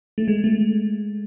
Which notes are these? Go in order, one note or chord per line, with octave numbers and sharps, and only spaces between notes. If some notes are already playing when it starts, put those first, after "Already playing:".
A3
G#3
A3